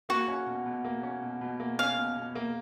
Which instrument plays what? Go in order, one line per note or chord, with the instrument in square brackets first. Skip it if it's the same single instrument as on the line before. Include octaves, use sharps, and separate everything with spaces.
[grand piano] A#3 [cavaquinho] F#4
[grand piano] C#4
B2
B2
A#3
C#4
B2
B2
A#3
[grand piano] C#4 [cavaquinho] F5
[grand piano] B2
B2
A#3